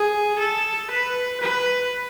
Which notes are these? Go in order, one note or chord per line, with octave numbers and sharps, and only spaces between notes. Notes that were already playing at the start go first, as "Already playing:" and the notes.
Already playing: G#4
A4
B4
B4